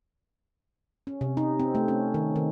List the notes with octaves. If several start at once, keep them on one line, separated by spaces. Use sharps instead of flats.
C#4
C3
D#4
C4
A3
C#4
D#3
D#3